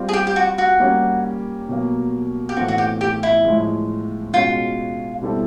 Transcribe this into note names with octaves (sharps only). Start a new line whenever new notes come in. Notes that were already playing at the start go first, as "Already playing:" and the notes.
Already playing: G3 C4 F4
G#4
G4
G4
F#4
F#4
G3 A#3 C#4
B2 F#3 A#3
G4
A2 E3 A3 C4 F4 F#4
F#4
G4
G4
E4
A2 F3 G#3
B2 G#3 C#4 F4 F#4
B2 G3 C4 E4 A4